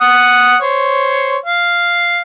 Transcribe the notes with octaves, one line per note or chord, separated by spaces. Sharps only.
F#5 D#6
C5 C#5
F5